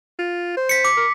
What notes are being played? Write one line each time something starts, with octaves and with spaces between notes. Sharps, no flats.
F4
C5
B6 C#7
D6
A#4